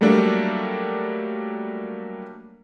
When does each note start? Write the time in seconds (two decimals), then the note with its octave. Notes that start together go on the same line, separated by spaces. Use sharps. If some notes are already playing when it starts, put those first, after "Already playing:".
0.01 F#3 G3 A3 A#3 D4